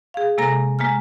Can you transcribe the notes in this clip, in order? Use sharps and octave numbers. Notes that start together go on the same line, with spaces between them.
G#4 F5
C3 G#3 A#3 A4 A#5 A#6
G#3 A#3 G#5 F6